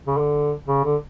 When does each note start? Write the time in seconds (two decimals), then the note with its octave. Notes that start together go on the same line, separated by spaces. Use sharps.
0.07 C#3
0.18 D3
0.68 C#3
0.84 D3